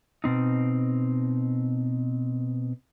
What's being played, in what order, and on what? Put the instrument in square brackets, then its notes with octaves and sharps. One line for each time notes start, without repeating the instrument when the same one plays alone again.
[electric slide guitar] B2 C4 D#4